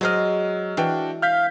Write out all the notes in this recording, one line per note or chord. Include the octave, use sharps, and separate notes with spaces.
F#3 G#3 C5 D#5 F6
E3 D4 F#4 G5
F5 F6 G6 B6